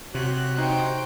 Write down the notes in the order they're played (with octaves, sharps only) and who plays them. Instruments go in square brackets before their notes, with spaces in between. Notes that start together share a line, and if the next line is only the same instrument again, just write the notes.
[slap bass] C3 [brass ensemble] F#4 C#5 [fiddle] F#6
[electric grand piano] D#4 F#6 [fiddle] C5 G5